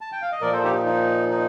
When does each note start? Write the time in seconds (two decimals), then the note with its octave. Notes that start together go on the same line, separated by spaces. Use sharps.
0.01 A5
0.12 G5
0.22 F5
0.32 D#5
0.41 A#2 F3 A#4 D5
0.52 A4 C5
0.64 D#4 G4
0.75 D#4
0.86 D#4
1.30 D#4